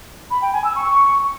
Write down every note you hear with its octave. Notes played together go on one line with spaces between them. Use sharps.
B5
G5
G#5
E6
C#6